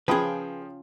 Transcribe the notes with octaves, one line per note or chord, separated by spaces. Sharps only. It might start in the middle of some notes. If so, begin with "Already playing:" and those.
F3 C#4 F4 G#4 B4 G5 D#6